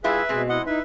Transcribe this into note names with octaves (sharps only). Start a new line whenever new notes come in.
G3 E4 F4 G#4 B4 E5
B2 G#3 C4 G#4
E4 D#5 F#5
D#4 E4 B4 E5